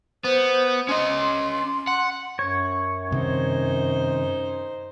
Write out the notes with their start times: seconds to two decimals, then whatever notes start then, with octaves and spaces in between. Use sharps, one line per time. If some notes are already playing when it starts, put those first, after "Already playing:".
0.24 B3 C5
0.89 C#4 D#5 C6
1.87 F#5
2.39 F#2 C#5
3.11 G2 C3 D#3 D#4 C5